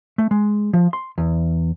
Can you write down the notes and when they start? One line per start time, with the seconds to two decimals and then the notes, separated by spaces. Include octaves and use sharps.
0.18 A3
0.31 G#3
0.73 F3
0.93 C6
1.18 E2